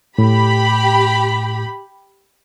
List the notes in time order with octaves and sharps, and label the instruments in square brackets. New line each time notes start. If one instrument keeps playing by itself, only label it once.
[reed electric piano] A2 [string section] G4 B5